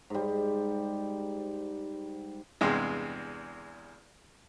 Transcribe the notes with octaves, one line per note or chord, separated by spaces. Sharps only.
G#2 G3
E2 G2 C3 G#3